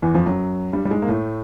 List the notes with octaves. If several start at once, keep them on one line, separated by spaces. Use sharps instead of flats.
E2 E3
F2 F3
F#2 F#3
G2 G3
G3
G#2 G#3
A#3
A2 A3